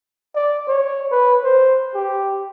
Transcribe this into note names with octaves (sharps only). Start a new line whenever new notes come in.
D5
C#5
B4
C5
G4